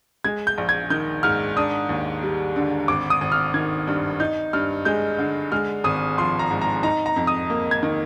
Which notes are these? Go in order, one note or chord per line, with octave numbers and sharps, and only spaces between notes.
G#3 G#6
G6
A#1
G#6
D#3 G6
G#2 F6
D4 D#6
D#2
G3
D3
G#1 D6
D#6
G#1
F6
D#3 G#6
G2
D#4 G6
G2 F6
G#3 G6
D3
G#3 F6
G#1 D#6
F3 C6
A#5
G#2
A#5
D#4 A#5
A#5
F2
D#6
A#3
G#6
D#3